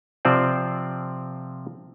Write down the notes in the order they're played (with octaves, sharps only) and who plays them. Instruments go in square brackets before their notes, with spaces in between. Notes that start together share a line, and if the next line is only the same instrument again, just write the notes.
[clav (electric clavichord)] C3 F3 C4 F4 C5 D5